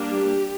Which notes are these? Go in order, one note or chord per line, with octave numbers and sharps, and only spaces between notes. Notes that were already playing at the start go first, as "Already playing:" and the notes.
Already playing: G3 A#3 D4
G4